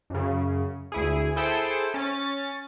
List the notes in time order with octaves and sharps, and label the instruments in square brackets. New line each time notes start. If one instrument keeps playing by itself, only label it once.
[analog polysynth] F#2 C#3
D2 E4 G#4
E4 G#4 A4 C5 G5
C#4 A6